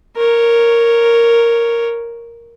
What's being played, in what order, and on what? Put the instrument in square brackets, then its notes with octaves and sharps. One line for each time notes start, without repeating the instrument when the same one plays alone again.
[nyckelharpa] A#4 C#5